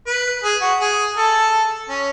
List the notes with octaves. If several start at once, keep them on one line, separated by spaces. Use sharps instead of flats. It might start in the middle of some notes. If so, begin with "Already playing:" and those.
B4
G#4
F#4
G#4
A4
C#4